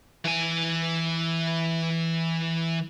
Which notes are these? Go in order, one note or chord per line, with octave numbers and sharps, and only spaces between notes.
E3 G#5